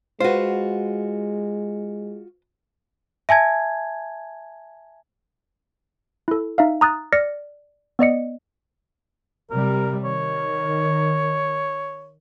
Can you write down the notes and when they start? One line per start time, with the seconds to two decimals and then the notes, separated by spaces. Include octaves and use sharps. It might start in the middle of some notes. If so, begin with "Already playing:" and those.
0.20 G#3 F4 F#4 B4 C5
3.29 E5 G#5 A5 G#6
6.28 E4 A4
6.58 D#4 E5 F5
6.81 A#5 D#6 F#6 A6
7.13 D5 F6 A#6 C#7
7.99 B3 D5 D#5 C#7
9.50 C3 G3 A#4
10.05 D#3 C#5